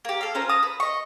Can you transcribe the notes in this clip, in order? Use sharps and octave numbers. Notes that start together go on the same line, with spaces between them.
A#3 G4
A4 F5
C#4 F4 A#4 C5
A5 A#5 D#6
B4
D#5 C#6